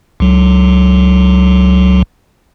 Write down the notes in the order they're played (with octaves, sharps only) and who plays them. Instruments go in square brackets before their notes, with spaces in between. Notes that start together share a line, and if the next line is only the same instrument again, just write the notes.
[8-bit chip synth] C#2 F#3